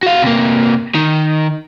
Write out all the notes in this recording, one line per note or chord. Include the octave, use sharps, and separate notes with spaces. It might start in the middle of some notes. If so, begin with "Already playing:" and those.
F#4 F5
C3 A#3
D#3